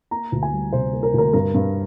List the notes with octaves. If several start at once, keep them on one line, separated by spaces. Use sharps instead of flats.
A#3 A#5
D2
G#5
G3
C3 C5
A#3
A#4
D2 A#4
G2 A#4
G2